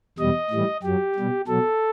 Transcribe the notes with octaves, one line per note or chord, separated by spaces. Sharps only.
E2 B2 G3 D#5
A2 E3 G3
F#2 F#3 G4
B2 G3
B2 F#3 A4